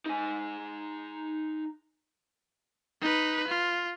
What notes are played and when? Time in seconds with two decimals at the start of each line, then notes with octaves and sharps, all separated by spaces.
0.06 D#4 G#5
3.01 D#4 B4
3.48 F4